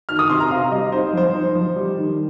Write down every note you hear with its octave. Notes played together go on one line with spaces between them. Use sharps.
D#3 F6
D#6
C3 C6
A#5
C4 F5
G3 D#5
D#4 C5
F3 C5
D#4
F3
G3
D#3